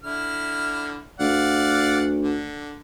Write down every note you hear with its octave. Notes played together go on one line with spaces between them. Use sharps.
D3 E4 F6
D2 D5 F5 F#5
D3